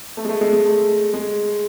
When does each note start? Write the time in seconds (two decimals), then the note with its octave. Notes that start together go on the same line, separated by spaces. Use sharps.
0.17 A3
0.25 G#3
0.29 A3
0.41 G#3
0.53 G#3
0.66 A3
1.14 G#3